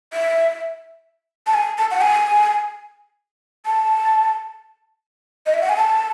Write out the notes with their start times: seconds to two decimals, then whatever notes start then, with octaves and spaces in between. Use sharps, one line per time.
0.13 E5
1.47 A5
1.54 G#5
1.78 A5
1.91 F#5
2.01 G#5
3.66 A5
5.46 D#5
5.54 E5
5.62 F#5
5.69 G#5
5.77 A5